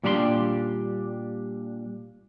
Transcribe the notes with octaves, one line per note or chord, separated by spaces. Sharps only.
A#2 G3 D4 G4 A#5 C6